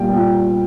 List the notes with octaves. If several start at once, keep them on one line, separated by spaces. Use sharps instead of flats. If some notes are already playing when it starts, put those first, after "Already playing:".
Already playing: A#2 G3 A#3 G5
A#2